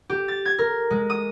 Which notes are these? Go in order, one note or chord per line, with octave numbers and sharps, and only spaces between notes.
G4
A6
G#6
A#4
G#3
D#6